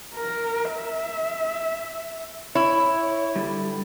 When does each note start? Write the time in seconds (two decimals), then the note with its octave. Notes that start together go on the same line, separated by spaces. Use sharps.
0.15 A#4
0.73 E5
2.55 E4 C#5
3.36 D3 G3